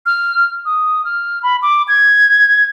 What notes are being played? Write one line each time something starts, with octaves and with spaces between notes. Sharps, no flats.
F6
D#6
F6
B5
D6
G#6